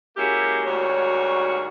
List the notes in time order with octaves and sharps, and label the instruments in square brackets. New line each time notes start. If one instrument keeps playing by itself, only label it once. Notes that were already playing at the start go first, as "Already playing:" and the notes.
[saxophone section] G#3 A#3 C#4 E4 F#4 G4
D2 G#2 D#3 G3 F#4 C#5